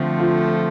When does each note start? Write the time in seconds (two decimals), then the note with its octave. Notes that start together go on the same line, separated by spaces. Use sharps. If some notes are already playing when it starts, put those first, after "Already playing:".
Already playing: D3 F3 A3 C4
0.19 F4